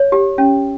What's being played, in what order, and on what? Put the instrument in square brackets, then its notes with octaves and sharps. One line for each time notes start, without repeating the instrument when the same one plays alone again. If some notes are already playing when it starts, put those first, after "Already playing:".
Already playing: [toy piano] C#5
G4
C#4